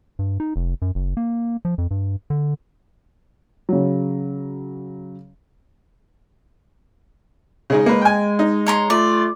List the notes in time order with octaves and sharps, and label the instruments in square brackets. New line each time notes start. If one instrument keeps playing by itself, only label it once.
[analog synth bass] G2
D#4
F1
F#2
F#1
A#3
F3
F2
G2
D3
[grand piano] C#3 F#3
[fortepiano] C#3 G#3 D#4
[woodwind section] G#3 [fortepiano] A#3 B4
[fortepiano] G5 G#5
D#4
[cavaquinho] C#5 A#5 C6
[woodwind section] A3 F4 [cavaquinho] D5